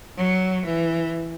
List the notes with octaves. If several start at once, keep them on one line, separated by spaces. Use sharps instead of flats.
F#3
E3